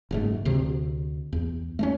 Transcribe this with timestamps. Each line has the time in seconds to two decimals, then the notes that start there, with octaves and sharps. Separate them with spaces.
0.11 F#1 G#2 A3
0.45 D2 C3
1.33 E2
1.79 A3 A#3 C#4